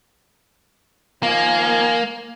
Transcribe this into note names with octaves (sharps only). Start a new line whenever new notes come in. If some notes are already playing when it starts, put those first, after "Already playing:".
D#3 F3 A#3 G#5